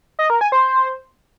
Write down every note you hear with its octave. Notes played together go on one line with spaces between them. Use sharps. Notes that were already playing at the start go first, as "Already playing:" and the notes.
D#5
A#4
G#5
C5